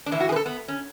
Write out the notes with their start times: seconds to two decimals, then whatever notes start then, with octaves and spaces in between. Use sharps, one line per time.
0.06 D4
0.11 A2 E3 E4
0.20 F#4
0.29 G#4
0.32 B4
0.36 A4
0.46 B3
0.68 C#4